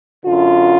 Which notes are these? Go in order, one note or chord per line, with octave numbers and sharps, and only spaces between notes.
F#2 D3 F4